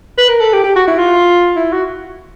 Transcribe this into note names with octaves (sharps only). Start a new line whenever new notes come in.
B4
A#4
A4
G4
G4
F#4
E4
F4
E4
F#4